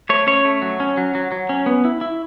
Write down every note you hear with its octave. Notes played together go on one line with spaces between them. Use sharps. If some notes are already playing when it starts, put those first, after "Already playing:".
A3 C#5
C#4 C#5
A3
F#3
C#4
F#3
F#3
F#3
C#4
B3
E4
E4